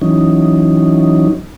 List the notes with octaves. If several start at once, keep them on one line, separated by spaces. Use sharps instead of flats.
E3 F#3 C#4 D#4